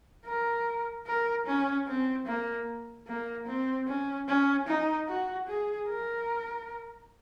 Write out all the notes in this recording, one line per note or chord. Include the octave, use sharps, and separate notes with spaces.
A#4
A#4
C#4
C4
A#3
A#3
C4
C#4
C#4
D#4
F#4
G#4
A#4